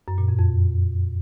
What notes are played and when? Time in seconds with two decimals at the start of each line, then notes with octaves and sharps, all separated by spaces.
0.08 F#2
0.18 A#2
0.28 F2
0.39 F2